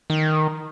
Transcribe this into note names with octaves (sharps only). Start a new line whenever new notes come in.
D#3